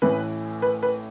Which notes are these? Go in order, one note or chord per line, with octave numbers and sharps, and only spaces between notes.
A1 A2 E3 B4
B4
B4